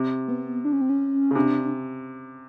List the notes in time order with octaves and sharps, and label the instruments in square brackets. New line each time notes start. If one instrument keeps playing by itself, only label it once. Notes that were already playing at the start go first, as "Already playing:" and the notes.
Already playing: [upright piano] C3
[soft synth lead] B3
D4
C#4
C4
C#4
[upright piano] C#3
[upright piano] C3 [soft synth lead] D4